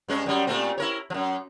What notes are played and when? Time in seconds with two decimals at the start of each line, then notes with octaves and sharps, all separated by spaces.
0.08 G2 G#3 C#4
0.26 F#2 G3
0.47 A#2 A3 C4
0.78 E4 A#4 C#5
1.10 F#2 F3